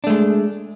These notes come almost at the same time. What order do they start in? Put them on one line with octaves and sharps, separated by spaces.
D4 A3 G#3